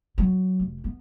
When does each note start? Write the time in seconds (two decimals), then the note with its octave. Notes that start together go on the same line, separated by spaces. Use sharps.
0.18 F#3
0.59 F1
0.84 B3